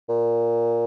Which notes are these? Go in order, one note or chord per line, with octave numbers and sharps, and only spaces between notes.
A#2